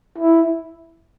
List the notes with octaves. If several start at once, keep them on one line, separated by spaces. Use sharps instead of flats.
E4